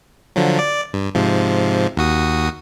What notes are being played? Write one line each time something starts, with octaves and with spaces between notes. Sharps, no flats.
D3 F3 F#3
D5
G2
G#2 C3 F3
D#2 F#4 D#6